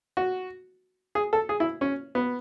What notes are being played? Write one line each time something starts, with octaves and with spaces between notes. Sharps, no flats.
F#4
G#4
A4
G#4
E4
C#4
B3